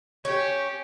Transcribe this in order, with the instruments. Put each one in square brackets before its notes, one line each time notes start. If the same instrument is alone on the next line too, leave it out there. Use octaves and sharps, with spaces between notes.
[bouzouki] C#4 [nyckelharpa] G4